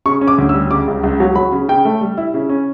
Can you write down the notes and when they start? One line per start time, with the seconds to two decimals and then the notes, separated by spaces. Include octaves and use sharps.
0.06 C#3 C#6
0.21 C#4
0.28 D6
0.38 D2
0.49 E6
0.54 G3
0.71 C#3 D6
0.88 C#2
1.03 C#2
1.20 F#3
1.35 F#3 B5
1.52 C#3
1.68 C#3 G5
1.85 A3
2.01 G3
2.17 E4
2.34 C#3
2.49 C#4